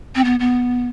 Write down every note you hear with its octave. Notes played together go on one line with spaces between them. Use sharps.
C4
B3
B3